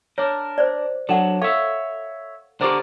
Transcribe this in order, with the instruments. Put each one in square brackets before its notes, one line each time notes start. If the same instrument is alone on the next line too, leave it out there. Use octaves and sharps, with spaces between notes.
[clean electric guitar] D4 A#4 [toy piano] C#5
[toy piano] C5 D5
[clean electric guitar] F#3 D4 [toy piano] A4 F#5
[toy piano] A4 F5 [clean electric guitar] C#5 E5
[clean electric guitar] D3 A#4 D5 [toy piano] G4 C5